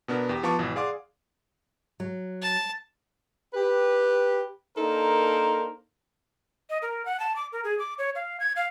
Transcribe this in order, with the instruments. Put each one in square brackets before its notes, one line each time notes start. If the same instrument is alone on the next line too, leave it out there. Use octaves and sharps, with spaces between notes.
[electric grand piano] B2 B3 D4 A#4
E2 G4
F3 B3 F4 A5 C#6 D6
G#1 B2 E3
G#4 D5 F5 F#5 C6 D6
[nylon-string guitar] F#3
[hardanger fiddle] A5
[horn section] G4 B4
A#3 D4 D#4 A4 A#4 C5
[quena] D#5
A#4
F#5
A5
D6
A#4
G#4
D6
C#5
F5
G#6
F5